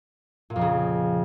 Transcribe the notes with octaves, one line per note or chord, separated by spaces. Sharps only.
A#2
F2
C#3